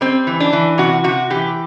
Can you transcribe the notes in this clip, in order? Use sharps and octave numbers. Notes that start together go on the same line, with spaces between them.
G3 C4
E3
D4
E3
C3 F#4
C3 F#4
E3 G4